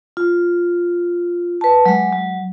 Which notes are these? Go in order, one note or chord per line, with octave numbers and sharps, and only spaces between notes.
F4
B4 A5
F#3 G#3
F#3